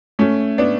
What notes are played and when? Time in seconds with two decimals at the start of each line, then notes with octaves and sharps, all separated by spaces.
0.19 A3 C#4
0.58 B3 D4